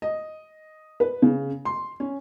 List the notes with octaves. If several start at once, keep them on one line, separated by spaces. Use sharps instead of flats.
D#5
B4
C#3
C6
C#4